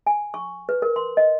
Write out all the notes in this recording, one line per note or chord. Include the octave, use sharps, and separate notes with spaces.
G#5
C#6
B4
A#4
C6
D#5